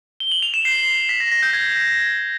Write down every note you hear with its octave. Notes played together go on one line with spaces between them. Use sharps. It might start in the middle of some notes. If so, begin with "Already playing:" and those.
G7
F#7
F7
E7
C7
B6
A#6
A#6
G6
G#6